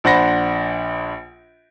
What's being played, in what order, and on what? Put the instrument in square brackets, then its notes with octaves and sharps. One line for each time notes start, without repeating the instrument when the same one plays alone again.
[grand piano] A#1 D4 C5 F#5 B5 A#6